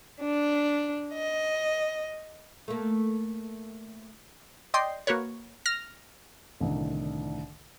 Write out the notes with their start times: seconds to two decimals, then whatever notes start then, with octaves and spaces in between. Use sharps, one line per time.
0.21 D4
1.13 D#5
2.68 A3 A#3
4.74 D5 D#5 G5 C6
5.07 A#3 F#4 A#4 B4 C#5
5.66 F6 A#6
6.60 C2 A2 D3 D#3